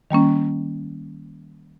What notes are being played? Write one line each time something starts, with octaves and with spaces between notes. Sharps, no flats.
D#3 G3 A#3 C#4